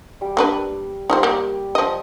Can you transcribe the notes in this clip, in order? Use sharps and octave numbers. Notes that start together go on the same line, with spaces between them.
G3 D6
A#3 D4 B4
G3 D#4 F4 C5
A#3 G4
F3 D#5